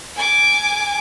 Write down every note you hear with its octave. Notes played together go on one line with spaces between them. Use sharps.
G#5 D6